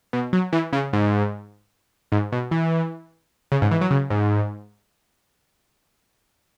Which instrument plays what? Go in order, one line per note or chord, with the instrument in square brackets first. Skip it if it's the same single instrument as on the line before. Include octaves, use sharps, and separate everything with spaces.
[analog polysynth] B2
F#3
E3
C#3
G#2
G#2
B2
E3
C#3
G#2
E3
F#3
C#3
G#2